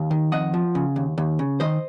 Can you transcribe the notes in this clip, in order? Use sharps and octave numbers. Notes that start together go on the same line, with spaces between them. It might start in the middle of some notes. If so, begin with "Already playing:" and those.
Already playing: D#2 F5
D#3
F2 D#5 F#5
F3
C#3
D#2
D#2
C#3
D#3 C5 D#5